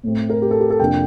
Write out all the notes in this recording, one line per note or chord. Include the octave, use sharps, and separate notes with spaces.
A2 A3 C4
A#4
G4
A4
G4
A4
F2 C3 F3 A#3 D4 G5